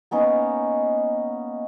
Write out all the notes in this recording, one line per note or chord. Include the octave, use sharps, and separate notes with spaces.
A#3 B3 C#4 D#4